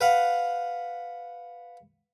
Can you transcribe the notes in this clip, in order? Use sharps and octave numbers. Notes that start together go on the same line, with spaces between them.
B4 F5 F#5